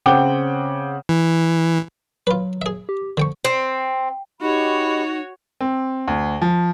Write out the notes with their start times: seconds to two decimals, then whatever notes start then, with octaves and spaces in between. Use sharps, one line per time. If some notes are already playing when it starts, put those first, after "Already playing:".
0.06 C#3 C4 F#5 G5 D6 G7
1.09 E3
2.27 F#3 F4 B4
2.62 G#4 E5
2.89 G4
3.17 D3 F3 G5 C#6
3.45 C4
4.41 D#4 F#4 G4 C#5 D#5 B5
5.61 C4
6.08 D2
6.42 F3